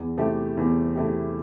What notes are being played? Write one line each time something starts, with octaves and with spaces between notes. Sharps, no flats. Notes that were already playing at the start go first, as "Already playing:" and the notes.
Already playing: E2
C3 A3 E4 G4
E2
C3 A3 E4 G4